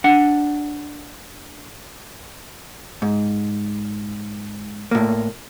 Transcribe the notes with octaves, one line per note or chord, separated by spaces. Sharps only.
D4 F#5
G#2
A2 A#3